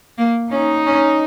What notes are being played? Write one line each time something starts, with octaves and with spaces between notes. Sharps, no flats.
A#3
C#4 D#4
C#4